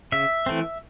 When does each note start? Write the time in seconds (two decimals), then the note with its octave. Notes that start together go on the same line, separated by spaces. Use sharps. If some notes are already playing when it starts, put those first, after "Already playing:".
0.12 C#3 E5
0.46 E3 A3 C4